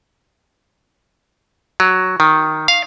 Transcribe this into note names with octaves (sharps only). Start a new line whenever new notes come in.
F#3
D#3
F5